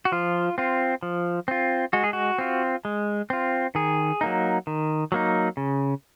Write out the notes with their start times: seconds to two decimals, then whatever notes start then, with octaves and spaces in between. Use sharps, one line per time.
0.05 F#4
0.12 F3 F4
0.58 C4 F4
1.03 F3
1.48 C4 F4
1.93 G#3 F#4
2.04 G#4
2.13 F#4
2.38 C4 F4
2.85 G#3
3.30 C4 F4
3.75 D#3 G#4
4.21 F#3 A#3 D#4
4.67 D#3
5.12 F#3 A#3 D#4
5.57 C#3